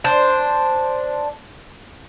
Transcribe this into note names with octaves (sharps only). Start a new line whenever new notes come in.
D4 C5